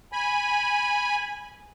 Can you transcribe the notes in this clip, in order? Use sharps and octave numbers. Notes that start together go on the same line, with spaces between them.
G#5 B5